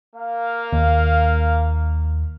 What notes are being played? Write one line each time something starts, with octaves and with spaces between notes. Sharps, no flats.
A#3 F5
D#2